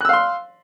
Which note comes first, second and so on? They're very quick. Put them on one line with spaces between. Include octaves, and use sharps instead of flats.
F#6 E6 F5 C6